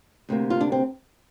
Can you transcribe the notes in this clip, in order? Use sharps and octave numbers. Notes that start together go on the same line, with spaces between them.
D2 C3 A#3
F4
D4
C4